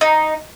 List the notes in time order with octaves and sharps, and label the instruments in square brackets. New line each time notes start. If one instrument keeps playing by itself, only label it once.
[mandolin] D#4